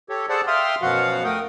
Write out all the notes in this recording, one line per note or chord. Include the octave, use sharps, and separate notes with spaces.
G4 A4 C#5
G#4 A4 C5 D5 F#5 A5
E5 F5 G5 C6 D#6 F6
F#2 B2 F3 F#4 F5 F#5
A3 A#4 G5 D#6